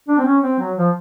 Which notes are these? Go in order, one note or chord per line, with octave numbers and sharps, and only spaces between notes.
D4
C4
C#4
C4
F#3
F3